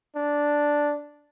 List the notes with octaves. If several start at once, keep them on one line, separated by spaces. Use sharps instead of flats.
D4